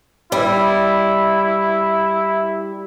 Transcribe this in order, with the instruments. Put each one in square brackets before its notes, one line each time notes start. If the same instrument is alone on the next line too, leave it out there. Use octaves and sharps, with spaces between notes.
[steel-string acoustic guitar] G3 [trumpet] E4